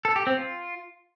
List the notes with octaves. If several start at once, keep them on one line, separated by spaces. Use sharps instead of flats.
A4
G4
C4
F4